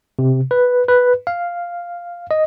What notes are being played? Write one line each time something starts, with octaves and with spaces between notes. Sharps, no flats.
C3
B4
B4
F5
D#5